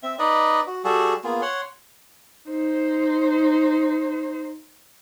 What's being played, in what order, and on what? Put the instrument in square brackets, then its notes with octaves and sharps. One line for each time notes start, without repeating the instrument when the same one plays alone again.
[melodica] C4 E5
D#4 B4 D5 D#5
F#4
G3 F#4 G#4 A4
A#3 B3 F4 G#4
C#5 F#5 C6
[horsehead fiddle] D#4 C5